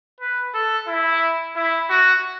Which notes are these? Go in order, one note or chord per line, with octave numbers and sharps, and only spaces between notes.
B4
A4
E4
E4
F#4